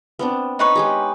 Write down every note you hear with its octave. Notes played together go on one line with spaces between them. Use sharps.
B3 C4 D4
D#4 B4 C#5
G#3 G4 G#4